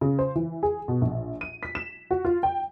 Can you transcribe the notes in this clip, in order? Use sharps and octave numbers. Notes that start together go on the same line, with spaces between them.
C#3
C5
E3
G#4
B2
A#1
D#7
B6
E7
F#4
F4
G5